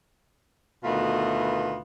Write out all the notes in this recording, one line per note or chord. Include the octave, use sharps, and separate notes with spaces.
D2 B2 D#3 A3 B3 F4